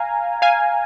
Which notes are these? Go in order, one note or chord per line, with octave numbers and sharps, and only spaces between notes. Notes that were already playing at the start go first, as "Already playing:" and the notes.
Already playing: F5 G#5 A#5
F5 G#5